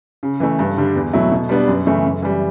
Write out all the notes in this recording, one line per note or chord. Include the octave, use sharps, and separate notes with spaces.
C#3
E3 A3 E4
G2
D3 G3 D4
E2
B2 F#3 A3 E4
B2
G3 B3 D4
F#2
C#3 E3 A3
F#2
E3 G3